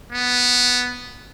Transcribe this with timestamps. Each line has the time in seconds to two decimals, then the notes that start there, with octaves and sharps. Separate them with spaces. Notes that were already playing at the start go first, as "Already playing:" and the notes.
0.12 B3